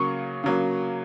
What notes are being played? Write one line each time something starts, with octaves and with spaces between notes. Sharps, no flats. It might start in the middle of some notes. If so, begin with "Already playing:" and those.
Already playing: C#3 F#3 A#3 C#6
C#3 F#3 A#3